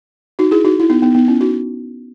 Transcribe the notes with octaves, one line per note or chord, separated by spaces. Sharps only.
D#4 F#4
E4 G#4
D#4 F#4
E4
B3 D#4
B3 D#4
B3 D#4
C#4 E4
D#4 F#4